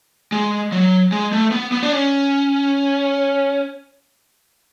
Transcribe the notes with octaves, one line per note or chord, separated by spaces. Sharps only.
G#3
F#3
G#3
A3
B3
B3
D4
C#4